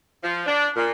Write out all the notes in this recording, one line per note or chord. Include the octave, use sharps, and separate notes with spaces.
F3
D4
A#2